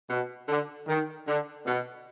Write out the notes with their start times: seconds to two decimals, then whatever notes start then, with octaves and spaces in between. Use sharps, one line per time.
0.08 B2
0.47 D3
0.87 D#3
1.26 D3
1.66 B2